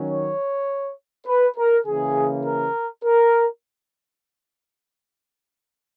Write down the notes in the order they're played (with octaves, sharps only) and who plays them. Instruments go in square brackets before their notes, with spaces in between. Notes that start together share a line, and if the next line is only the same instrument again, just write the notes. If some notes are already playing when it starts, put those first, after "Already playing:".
Already playing: [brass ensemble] D#3 F#3 C#4
C#5
B4
A#4
C#3 E3 A#3 G#4
A#4
A#4